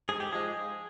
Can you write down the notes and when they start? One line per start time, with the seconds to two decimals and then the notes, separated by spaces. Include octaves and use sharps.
0.09 G#2 G#4
0.20 G4
0.32 F3 G#3 G#4